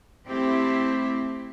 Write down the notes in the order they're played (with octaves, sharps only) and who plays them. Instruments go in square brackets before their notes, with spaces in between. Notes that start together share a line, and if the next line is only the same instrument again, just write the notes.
[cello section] A3 C4 E4 G4